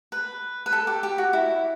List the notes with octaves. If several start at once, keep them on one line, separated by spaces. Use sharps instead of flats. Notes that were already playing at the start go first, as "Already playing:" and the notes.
B4
B4
A4
G4
G4
F#4
E4